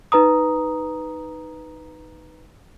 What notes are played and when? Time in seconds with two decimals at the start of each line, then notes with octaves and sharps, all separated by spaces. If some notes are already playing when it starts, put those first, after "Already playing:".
0.12 D#4 B4 A#5 D#6